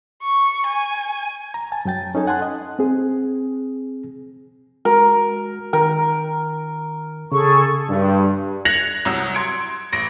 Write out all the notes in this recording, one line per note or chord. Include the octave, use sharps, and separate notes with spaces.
C#6
G#5
A#5
G#5 A5
F#2 F#3 G5 A6
C#4 D#4 A4 G#5
F#5 G#5 A5 C6 F#6
D#5
C4 G#4
G#3 F#4 A#4
D#3 A#4 G5
C#3 G#4 A4 C#6
G2
F#6 G#6 A#6 C#7 F7 F#7
C2 F#3 D#6 E6
C6 G#6 C#7 D7
A1 A#6 D7